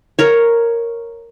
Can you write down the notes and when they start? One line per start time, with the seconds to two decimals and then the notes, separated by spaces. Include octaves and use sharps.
0.19 A#4 C#5